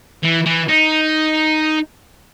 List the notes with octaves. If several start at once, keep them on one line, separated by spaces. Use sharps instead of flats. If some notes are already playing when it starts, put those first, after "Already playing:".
E3
E3
D#4